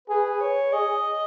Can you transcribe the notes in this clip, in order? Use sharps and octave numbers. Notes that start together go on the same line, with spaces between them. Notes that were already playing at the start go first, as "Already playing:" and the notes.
G#4 B4
C#5
G#4 D#5